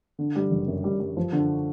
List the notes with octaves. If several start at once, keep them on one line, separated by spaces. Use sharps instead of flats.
D3
G3
F#1
F#2
G3
G3
F3
D3